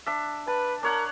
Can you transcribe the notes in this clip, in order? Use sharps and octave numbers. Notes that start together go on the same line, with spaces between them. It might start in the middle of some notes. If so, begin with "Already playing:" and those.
D4 E5
B4 A5
D4 A#4 C#5 F#5